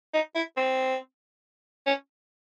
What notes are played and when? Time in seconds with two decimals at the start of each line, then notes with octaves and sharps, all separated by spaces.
0.14 D#4
0.35 E4
0.57 C4
1.86 C#4